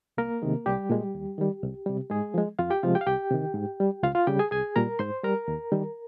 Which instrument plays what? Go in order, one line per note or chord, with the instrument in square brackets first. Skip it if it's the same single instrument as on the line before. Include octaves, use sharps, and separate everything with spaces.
[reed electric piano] C2 A#3 A#4
C3 D#3 G#3
C2 G3 G4
A#2 G#3
D#2
D#3 G3
C2
C3 G3
G#2 G#3 G#4
F3 G#3
F2 F4 F5
G4 G5
C3 F3 G#3 F4 F5
G4 G5
F5
C2 G4 G5
C3 D#3
G#2
G3
C#2 F4 F5
F4 F5
C#3 G3 G4 G5
G#4 G#5
C2 G#4 G#5
A#2 G3 A#4 A#5
G#2 C5 C6
G3 A#4 A#5
D#2
D#3 G3